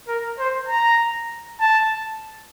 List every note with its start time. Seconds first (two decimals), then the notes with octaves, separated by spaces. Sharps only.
0.08 A#4
0.39 C5
0.69 A#5
1.61 A5